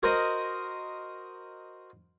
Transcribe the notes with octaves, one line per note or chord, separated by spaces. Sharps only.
F#4 A#4 C5 D#5